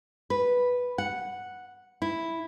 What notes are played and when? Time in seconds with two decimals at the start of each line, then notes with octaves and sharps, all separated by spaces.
0.30 B4
0.98 F#5
2.02 E4